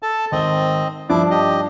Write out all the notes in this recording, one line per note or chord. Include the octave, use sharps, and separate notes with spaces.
A4 A5
G#1 C4 D#5 G5 G7
G2 F3 D4 E4 D6
G4 D#5